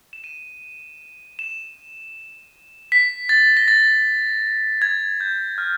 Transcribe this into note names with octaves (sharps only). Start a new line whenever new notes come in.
E7
D#7
E7
B6
A6
A#6
A6
G#6
G6
F6